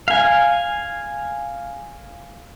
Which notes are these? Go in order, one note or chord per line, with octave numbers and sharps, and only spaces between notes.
F5 G#5